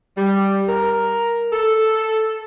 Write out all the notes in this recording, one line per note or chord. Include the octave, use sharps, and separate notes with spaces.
G3
A#4
A4